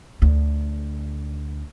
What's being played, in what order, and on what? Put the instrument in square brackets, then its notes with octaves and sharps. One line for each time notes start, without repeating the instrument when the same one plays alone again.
[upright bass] D2 D3